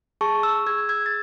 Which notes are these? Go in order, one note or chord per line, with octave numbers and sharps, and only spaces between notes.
G#4 A5 C#6
C#6 E6
G#4 E6 G#6
E6 G#6
A6